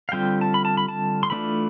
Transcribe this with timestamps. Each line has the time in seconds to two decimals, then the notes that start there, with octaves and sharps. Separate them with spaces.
0.09 F5
0.12 D3 G3 C4 F4 G5
0.41 A5
0.54 B5
0.65 A5
0.77 B5
0.89 A5
1.23 C6
1.30 E3 A3 D4 F4 B5